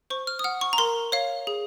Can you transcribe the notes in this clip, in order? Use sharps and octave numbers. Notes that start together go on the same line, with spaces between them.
C5 C#6
F6
D#6
F#5 F6
C#6
A#5
A#4 C6
C#5 F5
G#4